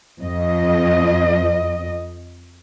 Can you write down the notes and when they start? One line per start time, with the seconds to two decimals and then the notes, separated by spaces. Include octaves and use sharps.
0.20 F2 D#5